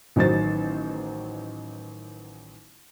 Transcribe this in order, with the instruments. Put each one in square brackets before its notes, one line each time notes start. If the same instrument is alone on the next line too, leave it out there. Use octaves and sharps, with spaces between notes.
[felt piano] A1 D#3 F#3 D#4 C5 A6